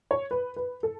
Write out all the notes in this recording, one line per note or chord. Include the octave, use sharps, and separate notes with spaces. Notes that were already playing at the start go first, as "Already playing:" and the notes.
C#5
B4
B4
A4